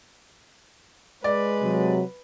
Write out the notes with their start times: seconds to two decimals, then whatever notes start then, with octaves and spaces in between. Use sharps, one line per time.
1.24 G#3 B4 D5
1.62 C3 F#3